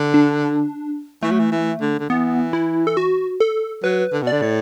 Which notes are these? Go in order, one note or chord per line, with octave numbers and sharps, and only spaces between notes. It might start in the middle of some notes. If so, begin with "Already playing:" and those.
Already playing: D3
D4
E3 A3
F#3
E3
E3
D3
D3
E3 B3
E4
A4
F#4
A4
F#3 B4
D3
B2
D3 D5
A2